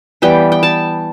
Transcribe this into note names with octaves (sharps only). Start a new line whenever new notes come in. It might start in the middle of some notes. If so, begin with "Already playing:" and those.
E3 G3 B3 G5
G5
A5